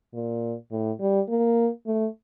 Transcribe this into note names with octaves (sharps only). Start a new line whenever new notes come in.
A#2
A2
G3
A#3
A3